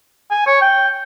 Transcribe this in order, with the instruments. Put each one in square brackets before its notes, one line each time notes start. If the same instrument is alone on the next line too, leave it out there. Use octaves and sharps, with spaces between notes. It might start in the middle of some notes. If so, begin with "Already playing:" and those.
[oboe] G#5
C#5
G5